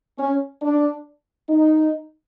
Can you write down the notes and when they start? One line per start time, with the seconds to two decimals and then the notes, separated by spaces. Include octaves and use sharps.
0.18 C#4
0.62 D4
1.49 D#4